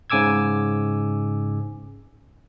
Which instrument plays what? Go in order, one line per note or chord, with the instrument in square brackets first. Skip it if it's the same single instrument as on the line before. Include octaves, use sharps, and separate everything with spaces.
[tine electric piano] G#2 C#3 G#5 D6 E6 G#6